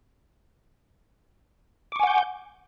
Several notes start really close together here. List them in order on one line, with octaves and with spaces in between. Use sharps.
D6 C#6 G#5 F#5 G6